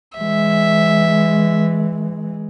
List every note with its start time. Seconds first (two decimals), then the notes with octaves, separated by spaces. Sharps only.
0.18 E3 G#3 E5